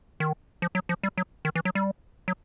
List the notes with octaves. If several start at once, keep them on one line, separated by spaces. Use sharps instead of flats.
D#3
F3
F#3
F3
G3
F#3
D#3
E3
F#3
G3
F#3